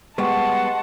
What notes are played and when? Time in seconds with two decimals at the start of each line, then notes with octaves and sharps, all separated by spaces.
0.18 G3 G#3 B3 D#5 F#5 A5 C6 C#6